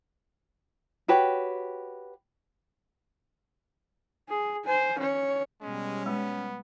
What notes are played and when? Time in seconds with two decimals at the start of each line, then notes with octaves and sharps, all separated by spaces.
1.08 F#4 G4 B4 C#5
4.30 G#4
4.65 C5 G#5
4.99 C#4 C#5
5.62 B2 G3 G#3 C#4
6.06 G#3 B3